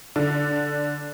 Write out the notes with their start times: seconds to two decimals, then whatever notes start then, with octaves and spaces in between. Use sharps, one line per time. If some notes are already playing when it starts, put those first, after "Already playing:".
0.16 D3